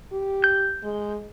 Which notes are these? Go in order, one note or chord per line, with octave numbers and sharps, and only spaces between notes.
G4
G6
G#3